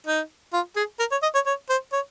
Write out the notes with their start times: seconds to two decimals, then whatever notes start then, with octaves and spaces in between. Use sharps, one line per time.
0.07 D#4
0.53 F4
0.76 G#4
1.00 A#4
1.12 C#5
1.23 D#5
1.35 C#5
1.46 C#5
1.70 C5
1.93 C#5